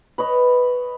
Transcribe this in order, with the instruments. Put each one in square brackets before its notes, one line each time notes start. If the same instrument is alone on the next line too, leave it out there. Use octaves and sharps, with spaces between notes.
[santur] B4 C#5 D#5